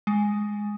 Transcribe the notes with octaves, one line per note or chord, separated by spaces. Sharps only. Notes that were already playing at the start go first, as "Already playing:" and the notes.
G#3